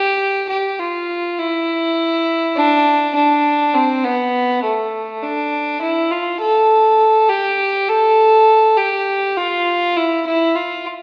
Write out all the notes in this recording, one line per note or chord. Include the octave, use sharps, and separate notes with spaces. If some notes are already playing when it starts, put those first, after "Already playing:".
Already playing: G4
G4
F4
E4
D4
D4
C4
B3
A3
D4
E4
F4
A4
G4
A4
G4
F4
E4
E4
F4